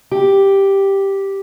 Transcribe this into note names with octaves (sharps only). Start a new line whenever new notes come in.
G4